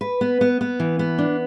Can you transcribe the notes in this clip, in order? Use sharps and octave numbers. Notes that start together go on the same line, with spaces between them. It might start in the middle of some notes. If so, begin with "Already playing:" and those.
B4
B3
B3
B3
E3
B3
D4